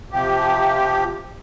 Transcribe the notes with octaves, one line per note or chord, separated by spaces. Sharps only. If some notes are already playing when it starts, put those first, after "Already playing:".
C3 F3 G4